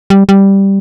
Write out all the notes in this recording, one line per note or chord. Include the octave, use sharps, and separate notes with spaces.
G3
G3